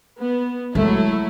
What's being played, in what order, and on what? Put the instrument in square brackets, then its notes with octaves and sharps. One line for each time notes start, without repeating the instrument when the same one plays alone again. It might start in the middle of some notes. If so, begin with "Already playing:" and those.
[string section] B3
[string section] F#3 A3 E4 [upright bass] G#3